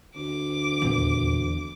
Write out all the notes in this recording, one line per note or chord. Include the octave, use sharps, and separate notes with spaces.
D2 D6
D#1 A#1 E2